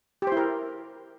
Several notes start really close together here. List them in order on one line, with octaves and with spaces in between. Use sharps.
G4 C5 E4 A#4